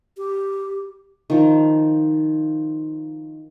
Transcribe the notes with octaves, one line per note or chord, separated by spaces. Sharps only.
G4
D#3 F3